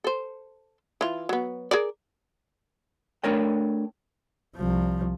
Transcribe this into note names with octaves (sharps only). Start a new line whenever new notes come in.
A4 C5
E3 F4
F#3 B3
G#4 A#4 D5
A3 D4 A#4 C#5 G5
C2 F3